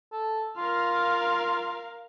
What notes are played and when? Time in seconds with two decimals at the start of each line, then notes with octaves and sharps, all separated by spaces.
0.12 A4
0.57 F4 A#4 F5